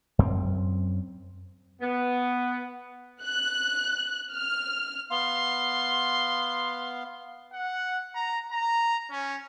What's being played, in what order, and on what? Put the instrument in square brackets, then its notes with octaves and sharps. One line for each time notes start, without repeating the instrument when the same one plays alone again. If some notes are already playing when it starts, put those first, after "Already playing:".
[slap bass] F#2 C4
[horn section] B3
[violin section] F#6
F6
[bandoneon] B3 F5 [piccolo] C6
[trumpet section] F#5
A#5
A#5
C#4